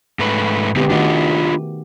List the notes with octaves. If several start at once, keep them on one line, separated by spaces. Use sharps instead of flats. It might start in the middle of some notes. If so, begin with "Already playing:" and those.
G#2 A3 B4
D3 G#3 B3 C4 G4
D#3 A3 D4 F4 F#4 D#5